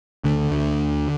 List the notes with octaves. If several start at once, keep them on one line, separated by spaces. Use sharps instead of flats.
D2 D3
D2